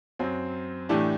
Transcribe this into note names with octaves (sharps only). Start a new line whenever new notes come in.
F#2 F#3 C4
A2 E3 A3 D4 G4